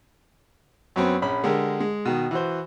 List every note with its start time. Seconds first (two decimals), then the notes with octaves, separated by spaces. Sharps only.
0.96 F#2 F#3 B3 C4
1.22 A#1 C#4 B5
1.44 D3 G#3 G4 A#4
1.80 G#3
2.05 B2 D#3
2.31 E3 F#4 C5